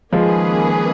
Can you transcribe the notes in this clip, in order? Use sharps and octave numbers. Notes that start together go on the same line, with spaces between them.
D#3 F3 G#3 A#3 C#4 G#4 B4